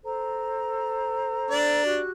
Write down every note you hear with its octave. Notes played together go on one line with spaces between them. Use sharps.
A4 C5 A#5
D4 D5
F#4 G4 F#6